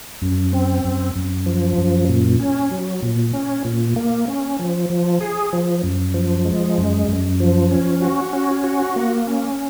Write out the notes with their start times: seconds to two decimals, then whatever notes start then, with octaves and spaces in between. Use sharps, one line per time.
0.22 F#2
0.53 C4
0.84 F#2
1.15 F#2
1.46 F3
1.78 F#2
2.09 A#2
2.40 C#4
2.71 F#3
3.02 A#2
3.33 C#4
3.65 A#2
3.96 A#3
4.28 C#4
4.59 F3
4.90 F3
5.21 G#4
5.53 F3
5.83 F#2
6.14 F3
6.45 G#3
6.78 F#2
7.08 F#2
7.40 F3
7.71 C#4
8.02 F#4
8.33 C#4
8.64 F#4
8.96 A#3
9.27 C#4